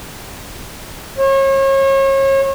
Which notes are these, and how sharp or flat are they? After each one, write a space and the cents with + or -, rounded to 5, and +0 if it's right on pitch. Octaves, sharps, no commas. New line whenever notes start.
C#5 -35